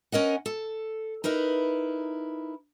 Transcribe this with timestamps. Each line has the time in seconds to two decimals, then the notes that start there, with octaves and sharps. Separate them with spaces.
0.12 C#4 A#4 D#5 F#5
0.46 A4
1.24 D#4 E4 A#4 B4